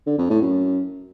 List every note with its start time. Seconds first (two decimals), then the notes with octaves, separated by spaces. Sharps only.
0.06 D3
0.18 F2
0.30 A2
0.42 F#2